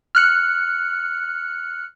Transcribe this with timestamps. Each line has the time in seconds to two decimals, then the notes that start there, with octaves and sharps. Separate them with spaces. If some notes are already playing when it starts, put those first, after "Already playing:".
0.15 F6 F#6 C#7